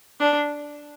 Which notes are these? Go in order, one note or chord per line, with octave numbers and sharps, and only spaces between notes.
D4